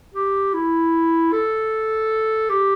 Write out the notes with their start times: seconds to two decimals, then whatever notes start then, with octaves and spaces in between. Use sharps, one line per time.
0.14 G4
0.53 E4
1.32 A4
2.50 G4